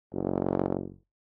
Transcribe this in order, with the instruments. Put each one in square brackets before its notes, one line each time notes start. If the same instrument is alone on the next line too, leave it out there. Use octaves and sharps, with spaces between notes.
[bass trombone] F#1